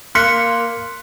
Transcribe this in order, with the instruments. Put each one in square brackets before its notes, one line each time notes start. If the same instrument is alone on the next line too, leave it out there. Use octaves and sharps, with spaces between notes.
[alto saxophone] A#3 [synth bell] C6 C#7 [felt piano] F6 F#6 B6